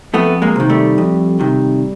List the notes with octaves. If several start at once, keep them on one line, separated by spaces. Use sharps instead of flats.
F2 A3 B3
G#3 A#3
C3 D#3
G3 A3
F2
C3 D#3